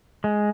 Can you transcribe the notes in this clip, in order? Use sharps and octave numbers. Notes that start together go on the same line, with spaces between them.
G#3